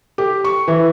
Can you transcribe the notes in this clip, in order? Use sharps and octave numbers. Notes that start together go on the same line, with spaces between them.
G4
C#6
E3